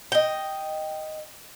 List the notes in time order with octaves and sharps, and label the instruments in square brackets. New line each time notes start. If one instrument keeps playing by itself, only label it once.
[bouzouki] D#5 G5